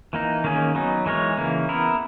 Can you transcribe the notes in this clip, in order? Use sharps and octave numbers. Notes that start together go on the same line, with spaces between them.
E3 A#3 D#4
D#3 A#3 C#4 G#4
F#3 B3 D#4
E3 G#3 D#4 A#4 C#5
C#3 E3 A#3
B3 E4 A#4